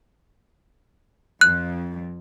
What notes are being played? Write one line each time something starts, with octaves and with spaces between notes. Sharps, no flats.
F2 F#6